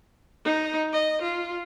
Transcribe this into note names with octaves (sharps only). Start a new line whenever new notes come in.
D#4
D#5
F4